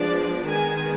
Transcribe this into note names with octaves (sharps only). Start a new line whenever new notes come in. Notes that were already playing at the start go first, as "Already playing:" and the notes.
Already playing: F3 G#3 B3 D4 D5
D#3 G#3 B3 G#5